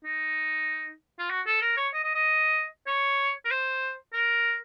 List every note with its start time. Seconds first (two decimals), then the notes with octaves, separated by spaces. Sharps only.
0.05 D#4
1.19 F4
1.30 F#4
1.47 A4
1.62 A#4
1.77 C#5
1.94 D#5
2.04 D#5
2.15 D#5
2.87 C#5
3.45 A#4
3.51 C5
4.13 A#4